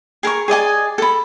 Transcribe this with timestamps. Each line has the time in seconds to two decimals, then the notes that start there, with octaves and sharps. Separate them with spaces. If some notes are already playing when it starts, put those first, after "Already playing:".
0.23 G#4 A#4 A#5 C#6
0.48 G#4 D5 D#5 G#5
0.98 A4 B5